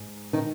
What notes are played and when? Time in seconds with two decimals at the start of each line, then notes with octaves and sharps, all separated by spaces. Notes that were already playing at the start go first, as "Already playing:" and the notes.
Already playing: G#2
0.33 D#3 D#4